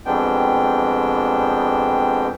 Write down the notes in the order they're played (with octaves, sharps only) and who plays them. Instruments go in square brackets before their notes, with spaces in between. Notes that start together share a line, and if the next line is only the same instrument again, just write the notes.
[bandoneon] F2 G3 G#3 B3 D4 G5